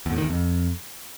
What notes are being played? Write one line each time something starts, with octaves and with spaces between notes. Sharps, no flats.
E2
A2
D#3
E2
F2